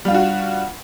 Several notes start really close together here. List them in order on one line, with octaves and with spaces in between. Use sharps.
G3 F4 D4 F#4